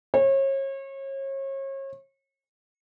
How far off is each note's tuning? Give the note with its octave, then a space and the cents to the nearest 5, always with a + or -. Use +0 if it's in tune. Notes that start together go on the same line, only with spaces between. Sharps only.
C#5 -35